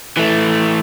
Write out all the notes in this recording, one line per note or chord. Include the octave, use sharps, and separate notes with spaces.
E3 A3